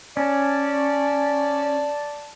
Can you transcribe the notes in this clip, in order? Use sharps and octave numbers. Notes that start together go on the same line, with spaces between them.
C#4 D5 A5